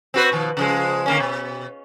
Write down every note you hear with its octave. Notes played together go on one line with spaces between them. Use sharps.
C4 F#4 B4
B2 D#3 F3
C#3 F3 G#3
D3 A#3 C#4
B2